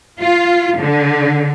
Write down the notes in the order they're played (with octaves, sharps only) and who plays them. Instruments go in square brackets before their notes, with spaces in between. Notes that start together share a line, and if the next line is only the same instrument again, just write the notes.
[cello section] F4
D3